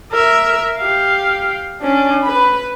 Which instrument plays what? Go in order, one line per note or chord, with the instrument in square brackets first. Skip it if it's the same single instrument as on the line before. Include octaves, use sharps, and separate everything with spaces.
[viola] A#4 E5
G4 F5
C#4 D4
B4 B5